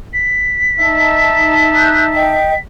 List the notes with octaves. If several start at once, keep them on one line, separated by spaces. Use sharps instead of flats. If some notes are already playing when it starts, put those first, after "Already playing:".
B6
D#4 E5 A5
F#6 G6
D#5 G5